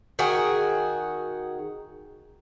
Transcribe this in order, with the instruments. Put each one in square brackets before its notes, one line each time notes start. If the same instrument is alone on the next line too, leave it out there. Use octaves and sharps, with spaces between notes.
[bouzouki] D#3 F#4 G#4